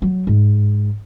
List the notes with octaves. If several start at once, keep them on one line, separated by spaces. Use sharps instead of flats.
F#3
G#2